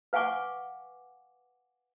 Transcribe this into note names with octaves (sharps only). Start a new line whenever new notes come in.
B4 F5 F#5 G#5 C#6 D6